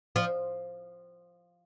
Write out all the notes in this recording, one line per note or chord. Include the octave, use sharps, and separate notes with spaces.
F3